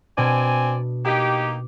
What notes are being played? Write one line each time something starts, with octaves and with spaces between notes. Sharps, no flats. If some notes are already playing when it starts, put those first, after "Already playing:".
B2 C4 D4 D5 G#5
A#3 D#4 G4 D6 B6